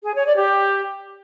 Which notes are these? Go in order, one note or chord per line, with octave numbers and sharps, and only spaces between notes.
G#4
C#5
D5
G4